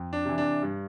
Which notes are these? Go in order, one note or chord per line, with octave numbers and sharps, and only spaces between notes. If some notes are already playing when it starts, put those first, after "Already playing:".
Already playing: F2
D4
C3 E3
D4
G2